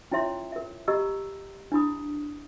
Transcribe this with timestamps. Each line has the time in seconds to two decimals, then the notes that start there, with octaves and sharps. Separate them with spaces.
0.11 C#4 E4 F4 C#5 E5 C6
0.52 A#4 E5
0.88 G4 D#5 A#5 B5 E6
1.72 D4 E4 B5 D#6